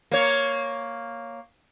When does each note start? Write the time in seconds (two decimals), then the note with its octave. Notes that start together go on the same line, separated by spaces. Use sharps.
0.12 A#3 C#5